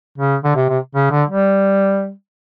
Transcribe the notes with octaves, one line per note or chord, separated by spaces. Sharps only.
C#3
D3
C3
C3
C#3
D3
G3